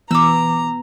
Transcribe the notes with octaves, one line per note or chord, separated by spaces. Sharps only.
E3 B3 A#5 D6 E6